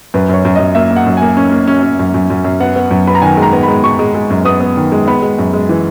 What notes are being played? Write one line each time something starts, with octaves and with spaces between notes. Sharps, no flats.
F#2 B4
F#2 C#5
F#2
F#2 D#5
A#3 E5
A#3
F#5
F#2
A#3 G#5
C#4
A#3
C#4
C#4
F#2
F#2
F#2
F#2
B3 F#5
B3
F#2
B3 B5
A#5
D#3 G#5
G#3
A#5
B3
G#3 B5
G#3 C#6
G#3
G#3
F#2
B3 D#6
B3
D#3
G#3
B3 B5
G#3
F#2
G#3
E3